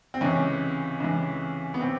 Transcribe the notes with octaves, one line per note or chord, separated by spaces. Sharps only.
C4
C#2 C3 E3 C#4
C#2 C3 E3
B3
C3 C4